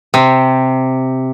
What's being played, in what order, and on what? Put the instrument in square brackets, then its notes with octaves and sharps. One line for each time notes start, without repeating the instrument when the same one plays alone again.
[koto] C3